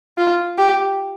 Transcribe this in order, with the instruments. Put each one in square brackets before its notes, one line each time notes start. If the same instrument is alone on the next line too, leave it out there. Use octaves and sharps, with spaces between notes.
[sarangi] F4
G4